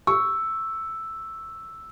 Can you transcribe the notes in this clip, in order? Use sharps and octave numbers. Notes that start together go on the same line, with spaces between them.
C#6 E6